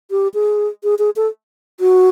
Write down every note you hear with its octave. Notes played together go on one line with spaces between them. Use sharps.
G4
G#4
G#4
G#4
A4
F#4